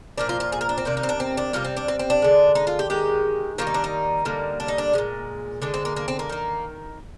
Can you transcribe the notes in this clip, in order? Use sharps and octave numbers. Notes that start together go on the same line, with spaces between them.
A#2 F3 A#3 D4
F4
F4
G#4
A#4
D4
C4
C3 D#3 A#3 D4
D#4
C4
D4
C4
D4
C3 G3 A#3 F4
C4
D4
C4
C4
D4
D3 G#3
D#4
F4
G4
D#3 G#3 G4
D#3 G3 A#3 F4
D#4
D4
D#4
D3 G3 A#3
D4
D#4
D4
A#2 F3 G#3
D3 G#3 D4
C4
A#3
A#3
C4
A#3
D#3 A#3